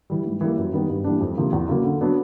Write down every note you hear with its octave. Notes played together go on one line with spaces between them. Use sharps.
E3 G3
G#2
E3 G3 A#3
F#2
D#3 G3 B3
G2
E3 G3 A#3 D4
F2
C3 F3 A#3 D4
E2
C#3 F#3 A#3
D3
F#3 B3 D4